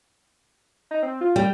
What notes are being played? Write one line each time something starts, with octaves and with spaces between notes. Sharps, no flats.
D#4
C4
F4
G3 G5